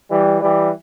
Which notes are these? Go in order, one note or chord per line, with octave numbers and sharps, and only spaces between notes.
E3 G3
E3 G3